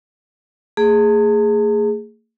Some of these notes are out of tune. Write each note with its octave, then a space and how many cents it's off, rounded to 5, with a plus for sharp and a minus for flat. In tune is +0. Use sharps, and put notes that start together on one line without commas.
A3 +45 G#4 +0